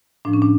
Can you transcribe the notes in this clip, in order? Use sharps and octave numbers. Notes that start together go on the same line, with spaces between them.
A2 F3 D4
C#4
D4